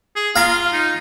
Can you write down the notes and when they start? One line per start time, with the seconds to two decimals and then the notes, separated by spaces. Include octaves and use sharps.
0.16 G#4
0.36 F4 F5 A#5
0.73 D#4